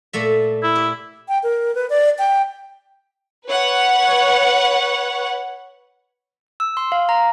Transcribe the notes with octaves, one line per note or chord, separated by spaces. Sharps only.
A#2 A3 E5
E4
G4
G5
A#4
B4
D5
G5
B4 C#5 F#5
E6
C6
F5
A#5